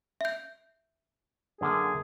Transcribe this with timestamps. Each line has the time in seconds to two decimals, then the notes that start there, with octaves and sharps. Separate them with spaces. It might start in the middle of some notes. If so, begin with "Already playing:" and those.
0.21 E5 G6
1.61 F#2 D3 A#3 G#4